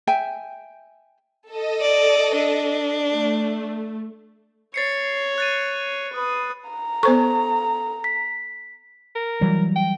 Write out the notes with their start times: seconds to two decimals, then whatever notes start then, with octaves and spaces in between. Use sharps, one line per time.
0.07 E5 G5 G#5
1.51 A4 D#5
1.81 D5
2.35 D4
3.14 A3
4.74 C#5 A6 C7 C#7
5.38 F#6 A6 D#7
6.13 B4 D#6
6.69 A#5
7.03 B3 A4 C5 C#6
8.04 B6
9.15 A#4
9.41 E3 F#3 G3
9.76 G5